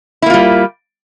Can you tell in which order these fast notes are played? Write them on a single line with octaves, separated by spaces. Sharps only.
E4 A#3 F4 G3